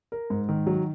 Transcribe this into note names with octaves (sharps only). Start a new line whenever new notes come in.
A#4
G#2
D#3
F#3